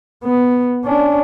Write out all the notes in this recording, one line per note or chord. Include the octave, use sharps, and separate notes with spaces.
B3
C#4 D4